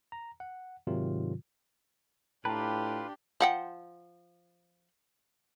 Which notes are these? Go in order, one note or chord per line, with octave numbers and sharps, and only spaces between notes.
A#5
F#5
G#2 C3 D#3 F#3 F4
A2 D4 F4 G4 B4 G5 A5 A#5
F3 F#5 G5